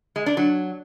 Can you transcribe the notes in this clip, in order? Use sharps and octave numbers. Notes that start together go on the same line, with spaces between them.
G#3
D4
F#3